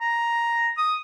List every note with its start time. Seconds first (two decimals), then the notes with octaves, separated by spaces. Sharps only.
0.01 A#5
0.77 D#6